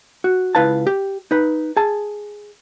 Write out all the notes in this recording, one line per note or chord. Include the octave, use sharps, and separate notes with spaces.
F#4
C#2 E4 B4 F5 A5
G4
D#4 B4
G#4 A5